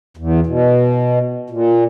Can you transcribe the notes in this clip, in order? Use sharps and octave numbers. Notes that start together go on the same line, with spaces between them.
E2
B2
A#2